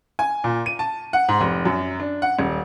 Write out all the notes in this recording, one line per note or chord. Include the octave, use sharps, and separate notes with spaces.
G#5
A#2
D#7
A5
F#5
G#2
F1
F#2
D4
F#5
D#1